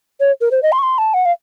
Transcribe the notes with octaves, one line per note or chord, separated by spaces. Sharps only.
C#5
A#4
C5
D#5
C6
C#6
C6
A5
F#5
F5